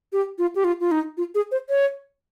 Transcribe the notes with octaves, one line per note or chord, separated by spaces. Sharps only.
G4
F4
G4
F4
F4
D#4
F4
G#4
C5
C#5